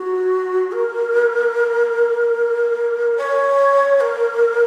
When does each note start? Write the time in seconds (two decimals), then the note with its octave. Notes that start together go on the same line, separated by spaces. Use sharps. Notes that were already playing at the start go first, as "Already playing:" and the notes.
Already playing: F#4
0.72 A#4
3.18 C#5
4.01 A#4